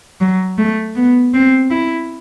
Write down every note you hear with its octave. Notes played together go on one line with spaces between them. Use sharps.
F#3
A3
B3
C4
E4